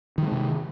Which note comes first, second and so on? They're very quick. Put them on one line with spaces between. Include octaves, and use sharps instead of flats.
D#3 F3 G#3 C3